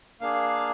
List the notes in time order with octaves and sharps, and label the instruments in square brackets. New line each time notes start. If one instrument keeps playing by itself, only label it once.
[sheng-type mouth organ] A#3 D4 G#4 F5